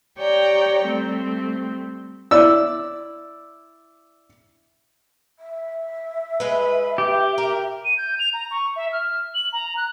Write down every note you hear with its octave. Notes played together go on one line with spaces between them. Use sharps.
G4 C#5 D5 G5 A#5
G3 A3 C4
E4 D5 E6
E5
G#3 B4
G4
A#4
D#7
G6
F7
A#5
C#6
E5
F6
F#7
A#5
F#6